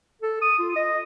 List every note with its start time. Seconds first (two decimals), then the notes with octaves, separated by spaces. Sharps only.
0.22 A4
0.41 D#6
0.59 F4
0.76 D#5